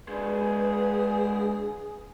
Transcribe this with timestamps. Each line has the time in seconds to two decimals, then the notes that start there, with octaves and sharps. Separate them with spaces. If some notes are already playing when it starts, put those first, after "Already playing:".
0.08 G#3 D4 G#4 B4